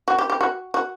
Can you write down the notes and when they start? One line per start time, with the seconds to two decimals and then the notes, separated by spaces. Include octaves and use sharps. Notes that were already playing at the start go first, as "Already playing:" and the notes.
0.08 F#4
0.19 G4
0.30 G4
0.41 F#4
0.74 F#4